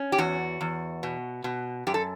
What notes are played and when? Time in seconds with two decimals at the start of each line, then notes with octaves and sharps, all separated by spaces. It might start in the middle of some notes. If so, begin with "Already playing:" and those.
Already playing: C#4
0.12 G4
0.18 E2 F#4
0.61 E2
1.03 B2
1.44 B2
1.87 F#2 G4
1.94 A4